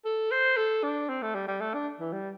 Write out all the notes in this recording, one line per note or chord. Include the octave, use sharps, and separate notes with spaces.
A4
C5
A4
D4
C4
A3
G3
G3
A3
D4
E3
G3